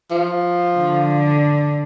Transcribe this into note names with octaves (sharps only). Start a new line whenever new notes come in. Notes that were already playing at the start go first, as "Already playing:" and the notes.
F3
D3